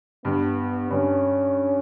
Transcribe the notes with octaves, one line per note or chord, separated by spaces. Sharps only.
G2 B3
G2 C#4